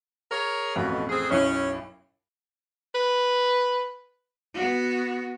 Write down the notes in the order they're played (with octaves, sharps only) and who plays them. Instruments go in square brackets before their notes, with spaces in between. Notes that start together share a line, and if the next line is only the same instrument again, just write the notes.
[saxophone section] G#4 A#4 C#5
[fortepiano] A1 F2 [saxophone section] B2
[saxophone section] C4 G#4
[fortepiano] B1 F#2 E4 [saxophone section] C#4
[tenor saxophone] B4
[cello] B3 F#4